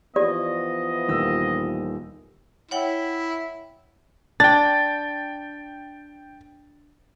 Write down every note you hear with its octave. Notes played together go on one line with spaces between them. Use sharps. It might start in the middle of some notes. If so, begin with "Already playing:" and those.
E3 F3 B3 G4 D5 D#5
D#1 D#3 E6
E4 C#5 F#5 G5
D4 G5 A6